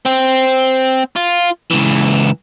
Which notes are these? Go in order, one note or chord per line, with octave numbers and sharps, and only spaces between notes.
C4
F4
C#2 E3